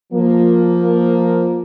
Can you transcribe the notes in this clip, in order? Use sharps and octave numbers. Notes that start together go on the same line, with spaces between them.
F3 A#3